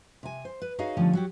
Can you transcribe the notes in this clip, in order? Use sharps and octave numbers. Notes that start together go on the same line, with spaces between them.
C3 G#5
C5
B4
D#4 F#4 G#4 C#5 D#5 F5
D3 D#3 F3 G3 A3 C#4
F#3 F#4 G4